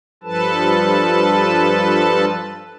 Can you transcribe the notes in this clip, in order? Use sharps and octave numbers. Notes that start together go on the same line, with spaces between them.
G2 F3 A4 B4 A5